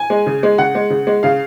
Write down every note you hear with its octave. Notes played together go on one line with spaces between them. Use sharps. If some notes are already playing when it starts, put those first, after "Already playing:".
Already playing: G#5
G#3
C#3
G#3
C#3 F#5
G#3
C#3
G#3
C#3 F5